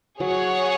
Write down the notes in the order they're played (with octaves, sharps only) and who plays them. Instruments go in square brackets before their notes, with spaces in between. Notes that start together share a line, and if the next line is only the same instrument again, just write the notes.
[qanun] F#3 [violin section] G#4 C#5 F#5